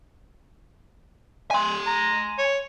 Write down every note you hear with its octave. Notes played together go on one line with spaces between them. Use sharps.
G#5 C6
A#5
C#5